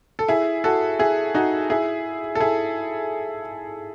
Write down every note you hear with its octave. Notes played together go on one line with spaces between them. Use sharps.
A4
E4 G#4
F#4 A4
E4 G#4
D#4 F#4
E4 G#4
A4
E4 G#4